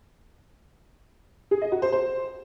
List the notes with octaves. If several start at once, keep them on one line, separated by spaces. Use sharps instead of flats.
G#4
D#5
F#4
C5
C5